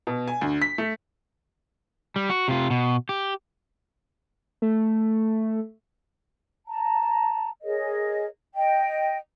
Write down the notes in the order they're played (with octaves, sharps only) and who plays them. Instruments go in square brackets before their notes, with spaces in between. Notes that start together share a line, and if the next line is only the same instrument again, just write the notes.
[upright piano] B2
G#5
D2
B6
A3
[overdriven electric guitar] G3
F#4
C3 F4
B2
G4
[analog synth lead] A3
[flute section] A5 A#5
G#4 A#4 C#5 D#5
D#5 G5